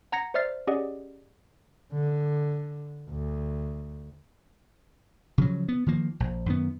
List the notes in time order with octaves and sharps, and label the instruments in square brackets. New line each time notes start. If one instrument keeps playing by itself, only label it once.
[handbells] F#5 A#5 G#6 A#6 C#7
C5 D5 E5 F6 A6 C7
C#4 G4 G#4 D5 D#5 F#5
[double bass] D3
D2
[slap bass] C#3 F3 F#3
B3
D#3 F3 A#3
A#1
F#2 D#3 B3